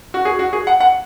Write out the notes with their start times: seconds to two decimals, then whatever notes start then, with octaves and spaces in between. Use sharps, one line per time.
0.14 F#4
0.25 G#4
0.39 F#4
0.53 G#4
0.67 F#5
0.80 F#5